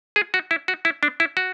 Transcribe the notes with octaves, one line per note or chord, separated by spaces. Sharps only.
G#4
F#4
E4
F#4
E4
D4
E4
F#4